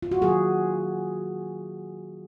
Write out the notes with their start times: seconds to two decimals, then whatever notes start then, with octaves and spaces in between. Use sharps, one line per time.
0.03 F4
0.11 F#4
0.21 D#3 F#3 A#3 G#4